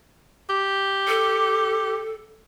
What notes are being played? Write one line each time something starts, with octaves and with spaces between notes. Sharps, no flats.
G4
A4